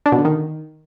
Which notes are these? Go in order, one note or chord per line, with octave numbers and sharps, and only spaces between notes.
D4
B2
D3
D#3